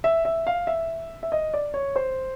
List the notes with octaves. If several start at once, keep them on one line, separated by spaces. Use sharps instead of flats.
E5
E5
F5
E5
E5
D#5
D5
C#5
C5